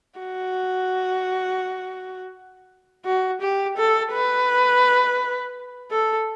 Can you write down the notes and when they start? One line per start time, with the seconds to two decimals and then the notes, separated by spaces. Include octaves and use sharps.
0.19 F#4
3.05 F#4
3.41 G4
3.77 A4
4.13 B4
5.91 A4